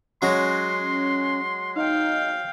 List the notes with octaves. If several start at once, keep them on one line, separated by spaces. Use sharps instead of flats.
F#3 G#3 C#4 F#4 C6
D#4 F5 G5